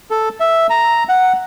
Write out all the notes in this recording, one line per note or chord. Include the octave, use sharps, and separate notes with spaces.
A4
E5
A#5
F#5